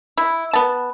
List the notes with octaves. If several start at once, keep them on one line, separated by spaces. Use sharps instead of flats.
E4
B3 A5